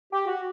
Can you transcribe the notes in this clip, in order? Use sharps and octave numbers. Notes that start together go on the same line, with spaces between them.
G4
F#4